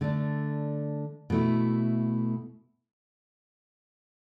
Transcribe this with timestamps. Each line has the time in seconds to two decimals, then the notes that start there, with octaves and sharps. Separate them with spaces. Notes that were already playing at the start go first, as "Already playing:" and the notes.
0.01 D3 A3 D4
1.30 B2 A3 E4